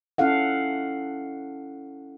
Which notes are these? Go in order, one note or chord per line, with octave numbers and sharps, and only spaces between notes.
C#4 E4 A4 F5 F#5